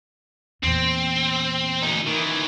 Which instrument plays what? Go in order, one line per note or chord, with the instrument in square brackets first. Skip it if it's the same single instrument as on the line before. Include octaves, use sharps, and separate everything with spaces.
[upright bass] E2 A#2 [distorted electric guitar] C4
[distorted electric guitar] D2 D#4
D#3 E3